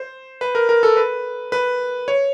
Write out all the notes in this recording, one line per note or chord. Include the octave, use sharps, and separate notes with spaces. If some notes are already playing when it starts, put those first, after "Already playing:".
Already playing: C5
B4
A#4
A#4
A4
B4
B4
C#5